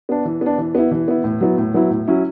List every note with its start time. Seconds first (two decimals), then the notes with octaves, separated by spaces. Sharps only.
0.09 B3 D4
0.25 E3
0.41 B3 D4
0.58 E3
0.75 B3 E4
0.91 E3
1.08 B3 E4
1.24 A2
1.41 F#3 B3 E4
1.58 A2
1.74 F#3 B3 E4
1.90 A2
2.08 F#3 C#4 E4